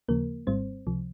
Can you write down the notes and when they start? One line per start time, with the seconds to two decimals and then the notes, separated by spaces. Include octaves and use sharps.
0.08 D#2 C#3 F3 A#3 A#4
0.47 G#1 G#2 G3 C4 C5
0.87 C#2 C3 F3